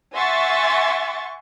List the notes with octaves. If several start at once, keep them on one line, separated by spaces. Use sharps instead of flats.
E5 F#5 G#5 C6 C#6 A6